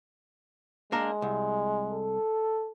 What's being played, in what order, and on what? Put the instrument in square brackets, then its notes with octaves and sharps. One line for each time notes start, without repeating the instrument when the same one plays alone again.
[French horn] G#3 [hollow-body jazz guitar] A#3 D4 A#4
[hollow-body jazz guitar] C2
[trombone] A4